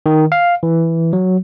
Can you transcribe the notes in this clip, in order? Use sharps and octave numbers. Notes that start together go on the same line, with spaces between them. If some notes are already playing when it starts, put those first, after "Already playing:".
D#3
F5
E3
F#3